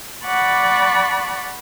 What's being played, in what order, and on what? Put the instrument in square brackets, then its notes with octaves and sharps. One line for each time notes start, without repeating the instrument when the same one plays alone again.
[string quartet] D5 F#5 A5 B5 C#6 D6